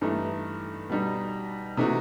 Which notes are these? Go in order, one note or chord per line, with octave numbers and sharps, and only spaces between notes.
G2 E3 A3 D#4 A4
B2 G3 D#4
C3 E3 A3 D#4 F#4